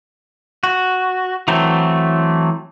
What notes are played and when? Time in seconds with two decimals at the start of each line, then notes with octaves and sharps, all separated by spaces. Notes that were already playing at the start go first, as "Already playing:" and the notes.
0.63 F#4
1.48 E3 F#3 A3 C4